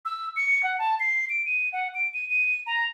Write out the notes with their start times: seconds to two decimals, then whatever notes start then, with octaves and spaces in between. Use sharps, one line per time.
0.05 E6
0.36 C#7
0.63 F#5
0.79 A5
1.00 C7
1.30 D7
1.46 D#7
1.73 F#5
1.95 D7
2.14 D#7
2.30 D#7
2.67 A#5